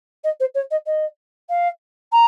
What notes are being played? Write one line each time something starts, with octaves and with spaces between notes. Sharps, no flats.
D#5
C5
C#5
D#5
D#5
F5
A#5